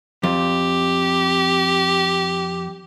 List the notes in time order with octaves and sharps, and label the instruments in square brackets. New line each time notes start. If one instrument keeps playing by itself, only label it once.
[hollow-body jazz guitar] F2 [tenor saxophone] G4